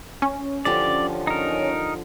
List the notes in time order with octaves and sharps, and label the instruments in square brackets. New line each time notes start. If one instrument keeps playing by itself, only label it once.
[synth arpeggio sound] C#4
[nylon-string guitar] D3 F3 G4 [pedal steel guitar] D5
[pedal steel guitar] D#4 A#4